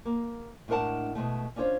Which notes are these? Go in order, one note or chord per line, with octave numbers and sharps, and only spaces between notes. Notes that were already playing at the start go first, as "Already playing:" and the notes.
A#3
A2 G#3 D4 A#4 F#5 A5
B2 E3 G#3 A3
C#4 D4 F4 C5 C#5